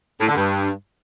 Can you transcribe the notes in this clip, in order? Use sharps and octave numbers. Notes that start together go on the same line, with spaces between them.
A2
D3
G2